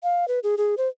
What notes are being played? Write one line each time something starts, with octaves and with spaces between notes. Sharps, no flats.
F5
B4
G#4
G#4
C5